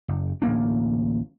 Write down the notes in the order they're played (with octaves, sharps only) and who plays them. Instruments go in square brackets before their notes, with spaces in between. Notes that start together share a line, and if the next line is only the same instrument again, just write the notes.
[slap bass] F#1
D1 A1 A#3 D4